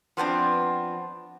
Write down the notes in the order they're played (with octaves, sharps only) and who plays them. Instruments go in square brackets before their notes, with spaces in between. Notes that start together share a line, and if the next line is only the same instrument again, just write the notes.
[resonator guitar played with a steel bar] F3 B3 C4 D4